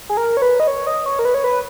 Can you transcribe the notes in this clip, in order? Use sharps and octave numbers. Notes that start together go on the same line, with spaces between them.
G#4
A#4
C#5
B4
D#5
C#5
D#5
C#5
A#4
B4
C#5
B4